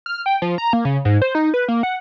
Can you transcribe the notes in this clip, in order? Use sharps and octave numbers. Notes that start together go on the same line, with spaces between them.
F6
G5
F3
A#5
A#3
C#3
G#2
C5
D#4
B4
A#3
F#5